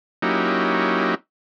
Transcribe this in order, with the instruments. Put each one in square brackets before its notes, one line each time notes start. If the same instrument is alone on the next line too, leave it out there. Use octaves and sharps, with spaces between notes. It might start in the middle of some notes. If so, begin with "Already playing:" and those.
[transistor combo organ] F#3 A#3 C#4 D#4 E4 G4